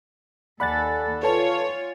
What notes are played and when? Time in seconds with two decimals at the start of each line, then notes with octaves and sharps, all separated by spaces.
0.60 D#2 A4 D5 F#5 G#5 B5 F#6 A6
1.23 F4 A4 B4 C#5 A5